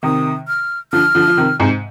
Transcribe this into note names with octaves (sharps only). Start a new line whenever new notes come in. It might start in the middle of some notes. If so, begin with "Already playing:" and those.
C3 D#3 D#6
F6
D3 F3 F6
D3 F3
F3
C3 D#3
G#2 C3